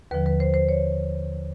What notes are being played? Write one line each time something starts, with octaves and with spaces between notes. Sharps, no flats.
D#2 D3 F3 B4
B4
C5
C5
C#5